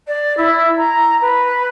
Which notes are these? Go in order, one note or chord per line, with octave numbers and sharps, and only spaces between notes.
D5
E4
A#5
B4